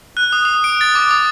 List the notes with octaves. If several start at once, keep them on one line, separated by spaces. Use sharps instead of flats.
F#6
D#6
D#6
D7
A6
D6
D#6